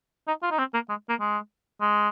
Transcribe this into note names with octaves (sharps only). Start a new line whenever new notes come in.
D#4
F4
D#4
C4
A#3
G#3
A#3
G#3
G#3